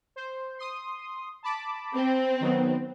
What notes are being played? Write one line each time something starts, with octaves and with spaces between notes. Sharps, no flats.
C5
C6 D#6
A5 B5 D6
C4
D#3 F#3 B3